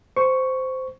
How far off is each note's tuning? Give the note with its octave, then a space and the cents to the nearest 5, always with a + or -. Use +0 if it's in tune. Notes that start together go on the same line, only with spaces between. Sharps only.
C5 -10 C#6 +5